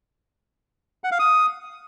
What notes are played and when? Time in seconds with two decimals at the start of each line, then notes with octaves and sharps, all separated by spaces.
1.04 F#5
1.12 F5
1.19 D#6